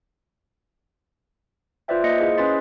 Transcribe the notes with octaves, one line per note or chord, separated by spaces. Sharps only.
F4 B4 C5 D5 E5 G5
A#3 D#5 C#7
E4 G#4 C5 D#5
C#4 B4 C6 A6 B6